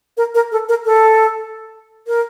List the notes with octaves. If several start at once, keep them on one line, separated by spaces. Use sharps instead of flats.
A#4
A#4
A4
A#4
A4
A#4